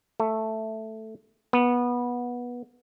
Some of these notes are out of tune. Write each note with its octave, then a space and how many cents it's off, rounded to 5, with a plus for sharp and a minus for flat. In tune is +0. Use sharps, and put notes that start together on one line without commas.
A3 +0
B3 -20